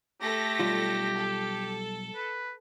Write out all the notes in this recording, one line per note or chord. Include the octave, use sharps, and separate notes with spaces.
A3 G4 A4 A#6
B1 G3 F4
A4
B4